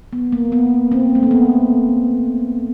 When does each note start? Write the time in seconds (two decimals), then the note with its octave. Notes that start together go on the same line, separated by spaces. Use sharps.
0.13 B3
0.32 A#3
0.52 B3
0.92 C4
1.15 A3
1.23 A#3
1.31 B3